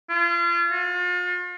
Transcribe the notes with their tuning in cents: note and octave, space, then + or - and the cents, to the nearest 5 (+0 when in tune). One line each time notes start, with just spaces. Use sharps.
F4 -35
F4 +40